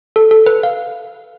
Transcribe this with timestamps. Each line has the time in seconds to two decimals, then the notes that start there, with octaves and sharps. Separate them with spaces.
0.16 A4
0.31 A4
0.46 B4
0.63 F5